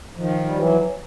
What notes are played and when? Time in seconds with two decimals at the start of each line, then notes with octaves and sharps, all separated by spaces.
0.17 D#3 F3
0.44 G3
0.56 E3 F#3